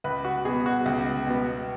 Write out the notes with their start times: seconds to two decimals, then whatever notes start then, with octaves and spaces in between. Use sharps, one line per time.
0.04 C#2 B4
0.25 F#4
0.45 B2 B3 G#4
0.66 F#4
0.86 C#2
1.27 B2 B3